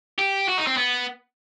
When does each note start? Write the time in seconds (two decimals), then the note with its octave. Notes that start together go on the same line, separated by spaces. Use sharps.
0.19 G4
0.49 F#4
0.58 D#4
0.67 C4
0.77 B3